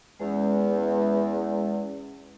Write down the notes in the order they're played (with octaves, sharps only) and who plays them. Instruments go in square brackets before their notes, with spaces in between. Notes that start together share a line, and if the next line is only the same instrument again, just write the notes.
[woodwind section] E2 [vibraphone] G#3 C#4